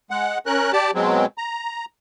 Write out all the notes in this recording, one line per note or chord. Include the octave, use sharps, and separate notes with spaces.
G#3 F#5
C#4 A#4 F#6
G4 D5 A5
B2 F#3 G#3 C4
A#5